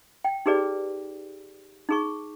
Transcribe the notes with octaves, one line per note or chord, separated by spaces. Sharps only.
G5
D#4 G4 G#4 B4 D5
D#4 G#4 C#6